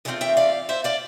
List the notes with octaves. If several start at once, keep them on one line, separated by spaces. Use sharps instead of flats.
E2 D3 A3 C4 F4
E5 G5
D5 F5
C5 E5
D5 F5